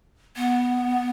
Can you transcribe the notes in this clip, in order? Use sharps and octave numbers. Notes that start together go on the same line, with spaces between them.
B3